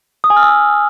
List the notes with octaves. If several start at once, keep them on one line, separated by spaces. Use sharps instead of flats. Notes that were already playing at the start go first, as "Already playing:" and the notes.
D#6
G#5
F6
E6
D#6